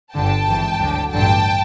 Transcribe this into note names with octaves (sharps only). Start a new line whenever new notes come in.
G1 G2 D3 G5 A5
G#1 G#2 E3
D2 D3 F#3
A1 G2 D3 F#3 G5 A5